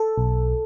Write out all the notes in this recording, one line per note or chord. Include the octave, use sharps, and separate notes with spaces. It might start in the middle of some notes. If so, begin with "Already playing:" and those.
Already playing: A4
B1